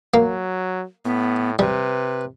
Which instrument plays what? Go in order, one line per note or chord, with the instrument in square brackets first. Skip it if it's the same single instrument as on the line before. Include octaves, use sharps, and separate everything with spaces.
[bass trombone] F#3 [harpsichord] A#3
[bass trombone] A2 [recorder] B3
[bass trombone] C3 [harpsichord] G3 [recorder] B4